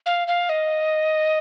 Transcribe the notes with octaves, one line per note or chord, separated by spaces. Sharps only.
F5
F5
D#5